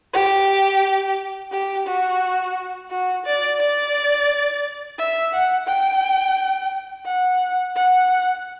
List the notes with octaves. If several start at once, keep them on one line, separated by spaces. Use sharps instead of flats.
G4
G4
F#4
F#4
D5
D5
E5
F#5
G5
F#5
F#5